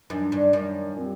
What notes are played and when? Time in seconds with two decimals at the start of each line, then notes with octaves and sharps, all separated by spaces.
0.10 F#2 D#3 G3 D4
0.32 G2
0.53 F#2 D#3 G3 D4
0.96 A#2 G3 C4 G4